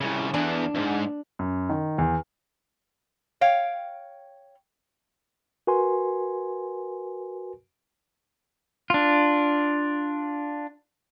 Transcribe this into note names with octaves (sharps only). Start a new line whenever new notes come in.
C2 C#3
E2 E3 D4
E2 G#2
F#2
D#3
E2
C#5 F5 G5
F#4 A#4 B4 G#5 C6
D4 F4